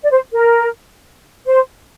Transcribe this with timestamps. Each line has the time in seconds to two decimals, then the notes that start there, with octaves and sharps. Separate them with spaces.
0.03 D5
0.10 C5
0.33 A#4
1.46 C5